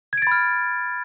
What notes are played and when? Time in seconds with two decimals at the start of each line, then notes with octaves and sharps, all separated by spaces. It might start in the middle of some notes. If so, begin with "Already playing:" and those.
0.13 G#6
0.17 D7
0.22 A6
0.27 B5
0.32 F6